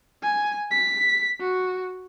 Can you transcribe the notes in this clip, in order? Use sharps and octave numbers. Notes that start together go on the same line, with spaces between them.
G#5
B6
F#4